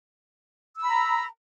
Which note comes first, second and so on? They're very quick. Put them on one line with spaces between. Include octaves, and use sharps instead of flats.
E6 B5 A#5